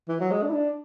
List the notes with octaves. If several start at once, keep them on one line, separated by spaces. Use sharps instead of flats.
E3
F#3
G#3
D4
E4
D4